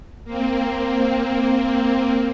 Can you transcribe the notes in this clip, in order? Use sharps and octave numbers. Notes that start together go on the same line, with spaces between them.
A#3 C4